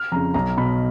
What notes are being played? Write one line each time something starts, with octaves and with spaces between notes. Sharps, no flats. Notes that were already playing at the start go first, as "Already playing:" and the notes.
Already playing: F6
F2 C#3 A#5
B1 A#5
B2 B5